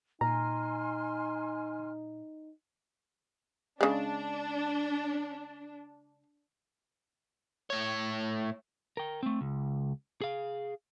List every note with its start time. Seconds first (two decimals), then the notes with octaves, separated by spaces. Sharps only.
0.21 A#2 D#4 G#5 A#5 C6 F6
3.81 C#3 G#3 D4
7.70 A2 C#5
8.97 A#4 G5
9.23 A3 C4
9.41 C#2
10.21 G#4 F5